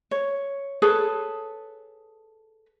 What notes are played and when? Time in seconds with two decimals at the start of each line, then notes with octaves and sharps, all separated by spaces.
0.11 C#5
0.82 G#4 A4 B4 C#5